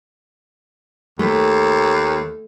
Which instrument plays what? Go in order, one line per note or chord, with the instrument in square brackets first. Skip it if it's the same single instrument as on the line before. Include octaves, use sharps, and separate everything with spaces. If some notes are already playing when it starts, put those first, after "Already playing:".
[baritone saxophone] D#2 [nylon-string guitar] A3